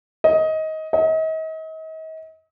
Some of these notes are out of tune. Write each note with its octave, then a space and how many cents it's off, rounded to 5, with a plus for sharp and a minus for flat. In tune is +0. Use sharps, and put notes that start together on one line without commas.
D#5 +20
D#5 +40